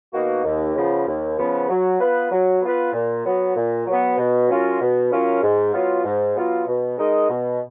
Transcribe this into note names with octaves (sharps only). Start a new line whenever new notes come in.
B2 A#3 D#4 F#4
D#2
C#3 F3 B3
D#2
C#3 F3 B3
F#3
B3 F4 B4
F#3
B3 F4 B4
A#2
F#3 B3
A#2
F#3
B3
B2
F#3 C#4 F4 A#4
B2
F#3 C#4 F4 A#4
G#2
F#3 B3 F4
G#2
F#3 B3 F4
B2
G#3 D#4 A#4 D#5
B2